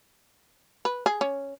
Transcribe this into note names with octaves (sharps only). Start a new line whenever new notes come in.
B4
G#4
C#4